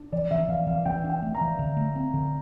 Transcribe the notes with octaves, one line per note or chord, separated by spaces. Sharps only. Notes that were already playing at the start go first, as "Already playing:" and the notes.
Already playing: D4
E3 D5
E3 E5
E3 F5
E3 F5
E3 G5
D4
G5
A3
A#5
E3
D3
A3
C4
D3